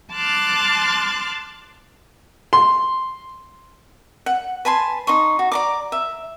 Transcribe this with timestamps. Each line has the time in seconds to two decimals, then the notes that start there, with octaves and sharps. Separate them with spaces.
0.12 A5 C6 D6 F6 F#6 A6
2.53 C6
4.26 F#5
4.65 B4 G#5 A5 C6
5.07 D#4 C6 C#6
5.39 F#4
5.52 D5 A#5 D6
5.92 E5